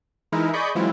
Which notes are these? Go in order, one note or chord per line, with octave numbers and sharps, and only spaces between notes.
E3 G#3 D#4 E4 A#4
G#4 D5 D#5 B5 C#6 G6
E3 F#3 G#3 C4 E4 F4